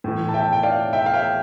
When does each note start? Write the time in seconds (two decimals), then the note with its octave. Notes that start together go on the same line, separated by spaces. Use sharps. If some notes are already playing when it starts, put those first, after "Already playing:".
0.04 A2 E3
0.29 A5
0.34 E5 G5
0.53 G5
0.63 D5 F5
0.93 E5 G5
1.06 F5
1.14 E5 G5